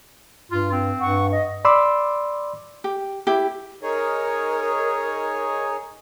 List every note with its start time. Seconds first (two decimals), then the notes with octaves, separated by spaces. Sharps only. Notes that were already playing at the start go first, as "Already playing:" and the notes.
0.51 G2 F4
0.72 C4
0.99 G2 F#5 C#6
1.30 D#5
1.65 D5 B5 C6 D6 E6
2.84 G4
3.27 E4 G4
3.83 D#4 G#4 A#4 C#5